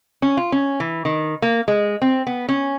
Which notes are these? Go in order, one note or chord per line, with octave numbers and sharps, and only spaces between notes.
C#4
F4
C#4
E3
D#3
A#3
G#3
C4
B3
C#4